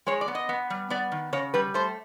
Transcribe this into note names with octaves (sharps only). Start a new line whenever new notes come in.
G#3 C#5
D5
B3
D#5
B3
G3
B3 D5
D#3
C#3 C#5
G3 B4
A3 C5